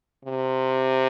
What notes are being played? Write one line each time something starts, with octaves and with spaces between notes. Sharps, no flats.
C3